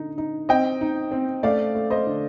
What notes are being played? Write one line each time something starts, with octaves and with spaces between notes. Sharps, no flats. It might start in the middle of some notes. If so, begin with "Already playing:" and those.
Already playing: D3 D#4
D#4
C4 D#5 G5
D#4
C4
A3 D5 F5
A3
C5 D#5
D3